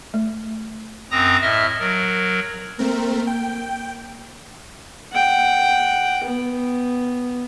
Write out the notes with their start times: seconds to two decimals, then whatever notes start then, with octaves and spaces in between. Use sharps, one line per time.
0.14 A3
1.11 F#2 C4 A#5 D#6 A#6
1.42 A2 D#5 E5 F6
1.80 F#3 A#4
2.79 A3 A#3 C4 A#4
3.27 G5
5.12 F#5 G5
6.24 B3